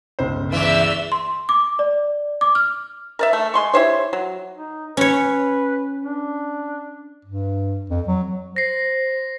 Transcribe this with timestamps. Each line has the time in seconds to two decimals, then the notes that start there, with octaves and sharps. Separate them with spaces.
0.19 G1 C#2 C5
0.52 E2 E3 D5 E5 E6
1.12 C6
1.49 D6
1.79 D5
2.41 D6
2.55 F6
3.19 A#4 D5 E5
3.33 A3
3.54 G#3 C6 C#6
3.74 E4 G4 C5 C#5
4.13 F#3
4.55 D#4
4.97 C#4 B4 C#5
6.04 D4
7.25 G2
7.90 F2
8.08 F#3
8.56 C5 A#6 C7